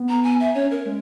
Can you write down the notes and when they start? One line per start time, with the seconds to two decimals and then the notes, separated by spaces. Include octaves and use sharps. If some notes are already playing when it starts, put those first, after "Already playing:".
Already playing: B3
0.09 A#5
0.24 G#5
0.40 E5
0.55 C#4 C#5
0.71 A#4
0.86 G#3